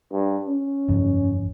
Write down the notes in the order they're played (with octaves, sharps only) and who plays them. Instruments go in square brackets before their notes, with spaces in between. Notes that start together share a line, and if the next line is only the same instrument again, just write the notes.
[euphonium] G2
C#4
[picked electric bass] G1 F2